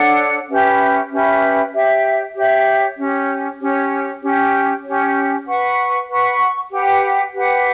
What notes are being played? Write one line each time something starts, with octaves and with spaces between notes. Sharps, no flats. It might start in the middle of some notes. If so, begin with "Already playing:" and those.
Already playing: D4 A4 C#5 F#5
C#4 G4 B4 E5
C#4 G4 B4 E5
G4 C#5 E5
G4 C#5 E5
C#4 G4 C#5
C#4 G4 C#5
C#4 G4 C#5
C#4 G4 C#5
B4 F#5 C#6
B4 F#5 C#6
G4 B4 F#5
G4 B4 F#5